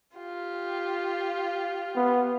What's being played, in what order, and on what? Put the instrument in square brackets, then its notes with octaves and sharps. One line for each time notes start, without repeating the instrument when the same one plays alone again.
[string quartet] F4 G4
[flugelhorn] B3